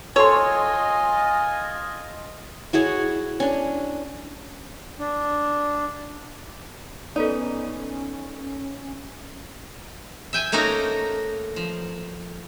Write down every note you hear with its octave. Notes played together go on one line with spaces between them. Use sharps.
F4 A4 C#5 D#5 G#5 C6
E4 F#4 G#4 C#5
C#4 D4
D4
B3 C#4 D#4 A4 D5
E5 G5 G#5
A3 A#3 C#4 D#4 F#4 A#4
F3